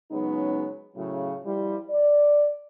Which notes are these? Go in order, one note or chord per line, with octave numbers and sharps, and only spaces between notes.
C#3 F#3 G#3 B3 C#4 D#4
A2 C#3 F#3
F3 G3 E4
D5